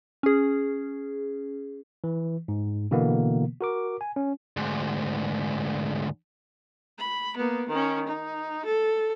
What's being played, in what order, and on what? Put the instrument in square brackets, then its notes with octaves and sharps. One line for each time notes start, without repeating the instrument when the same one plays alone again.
[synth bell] C#4 G#4
[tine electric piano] E3
G#2
B2 D3 E3 A#3 B3
F#4 A#4 D6
G#5
C#4
[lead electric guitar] D2 G#2
[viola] B5
A#3 B3
D#3 C#4
D#4
A4